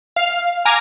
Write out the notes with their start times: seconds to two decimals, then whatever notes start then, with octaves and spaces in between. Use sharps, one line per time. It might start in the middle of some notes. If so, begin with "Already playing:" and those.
0.16 F5
0.65 G#5 A#5 D6 F6